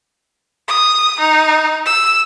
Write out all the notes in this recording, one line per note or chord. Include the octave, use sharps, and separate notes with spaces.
D#6
D#4
E6